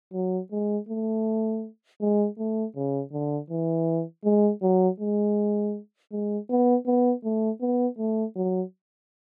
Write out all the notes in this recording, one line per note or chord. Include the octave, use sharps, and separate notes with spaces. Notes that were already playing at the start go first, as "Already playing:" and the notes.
F#3
G#3
A3
G#3
A3
C#3
D3
E3
G#3
F#3
G#3
G#3
B3
B3
A3
B3
A3
F#3